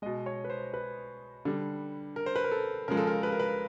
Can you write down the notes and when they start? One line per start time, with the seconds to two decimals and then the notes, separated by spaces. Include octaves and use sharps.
0.02 B2 G#3 D#5
0.26 C#5
0.44 B4
0.50 C5
0.74 B4
1.45 D3 G3
2.16 A#4
2.26 C5
2.36 B4
2.44 A#4
2.52 A4
2.88 C#3 F3 G#3 A#4
2.97 A4
3.07 A#4
3.23 B4
3.32 A#4
3.39 B4